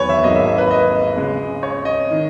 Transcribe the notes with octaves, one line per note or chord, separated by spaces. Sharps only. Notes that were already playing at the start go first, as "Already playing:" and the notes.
Already playing: E2 D#3 F#3 B4 C#5
E5
G#1 G#2 F#3 A#3 D#5
E5
E5
B4
D#5
C#2 C#3 G#3
C#5
D#5
D#3